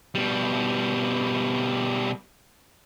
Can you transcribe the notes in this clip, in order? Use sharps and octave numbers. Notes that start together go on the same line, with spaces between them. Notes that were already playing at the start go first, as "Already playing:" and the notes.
B2 G3